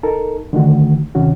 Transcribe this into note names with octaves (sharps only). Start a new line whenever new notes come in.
D#4 A4 A#4
D3 D#3 A3 F#4
D2 C3 D#3 C#4 F#4